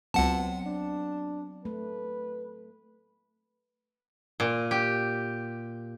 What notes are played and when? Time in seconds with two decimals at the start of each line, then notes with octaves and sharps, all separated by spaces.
0.14 C#2 F#3 B3 C4 F#5 A5
0.65 D4
1.65 A3 B4
4.40 A#2
4.71 G4